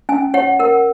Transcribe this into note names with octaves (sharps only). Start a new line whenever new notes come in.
C#4 G#5
C#5 F#5
A#4 F#5